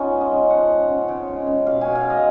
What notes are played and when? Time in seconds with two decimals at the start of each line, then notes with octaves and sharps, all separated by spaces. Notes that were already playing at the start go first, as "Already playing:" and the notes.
Already playing: C#3 B3 C#4 D#4 F4
0.11 G#3
0.21 D#5
0.31 C#3
0.50 F3 F#5
0.70 G#3
0.89 C#3
1.08 C#3
1.28 G#3
1.47 C#3
1.66 B2 F5
1.81 B2 G#5
1.95 F5
2.05 G#3
2.10 D#5